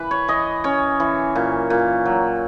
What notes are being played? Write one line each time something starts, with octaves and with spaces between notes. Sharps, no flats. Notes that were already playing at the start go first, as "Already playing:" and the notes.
Already playing: E3 B4
C#5
E3 D#5
C#4 C#5
E3
A#2
A#2
F#3